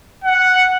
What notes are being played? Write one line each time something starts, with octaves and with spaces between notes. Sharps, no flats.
F#5